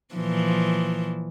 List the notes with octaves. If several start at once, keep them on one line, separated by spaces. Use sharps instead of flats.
A#2 E3 F3